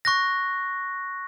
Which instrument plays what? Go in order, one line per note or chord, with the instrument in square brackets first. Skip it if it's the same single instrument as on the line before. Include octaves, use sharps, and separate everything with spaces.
[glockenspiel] C#6 F#6 A#6